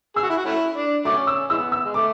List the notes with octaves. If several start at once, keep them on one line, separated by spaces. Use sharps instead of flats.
G#4 E6
F#4
E4
F#4
A3 C#4 E4
D4
F#3 A3 C#4 D6
E6
E3 G#3 B3 E6
E6
G#3
A3 D6